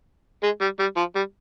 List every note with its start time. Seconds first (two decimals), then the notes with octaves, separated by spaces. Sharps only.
0.43 G#3
0.61 G3
0.79 G3
0.97 F3
1.16 G3